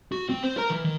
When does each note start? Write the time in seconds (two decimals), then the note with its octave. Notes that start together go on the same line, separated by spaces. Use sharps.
0.12 F#4
0.29 C4
0.43 C5
0.57 A#4 A#5
0.70 E3
0.84 D#3